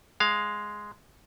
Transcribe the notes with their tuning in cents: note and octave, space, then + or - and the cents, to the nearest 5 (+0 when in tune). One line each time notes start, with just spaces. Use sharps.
G#3 +0 F5 +0